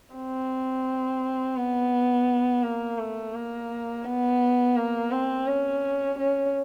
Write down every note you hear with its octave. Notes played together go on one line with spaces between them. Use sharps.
C4
B3
A#3
A3
A#3
B3
A#3
C4
C#4
C#4